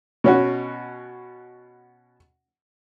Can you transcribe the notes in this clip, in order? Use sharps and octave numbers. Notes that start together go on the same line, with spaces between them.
B2 C#4 F#4